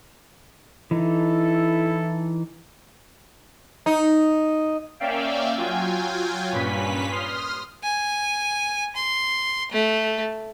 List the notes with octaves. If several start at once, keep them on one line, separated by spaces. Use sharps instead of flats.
E3 D#4 E4 A4
D#4
A#3 C#4 D5 E5 F5 G5
F#3 F4 G5 G#5
G2 A#2 C#4 B4 B6
C6 D#6 F6
G#5
C6
A3